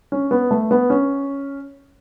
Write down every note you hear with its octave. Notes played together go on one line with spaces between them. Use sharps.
C#4
B3
A3
B3
C#4